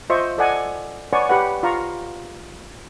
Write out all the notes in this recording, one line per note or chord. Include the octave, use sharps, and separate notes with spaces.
F4 C5 D#5 E5 C#6
A4 D5 D#5 F#5 G#5
B4 C#5 D5 F#5 G#5 C#6
G4 B4 F#5
F4 F5 A#5 C#6